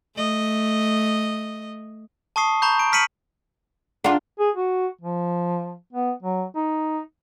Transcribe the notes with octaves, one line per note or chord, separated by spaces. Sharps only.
A3 D#5
A5 C#6 D#6 C7
A#5 B5 C#6 G6
D7
F6 B6 C#7 D#7 F#7
D4 F4 G#4 F#5 A#5
G#4
F#4
F3
B3
F#3
D#4